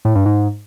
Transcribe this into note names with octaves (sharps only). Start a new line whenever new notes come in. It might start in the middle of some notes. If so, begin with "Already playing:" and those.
A2
G2
G#2